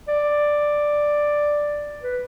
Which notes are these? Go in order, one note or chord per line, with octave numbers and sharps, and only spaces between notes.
D5
B4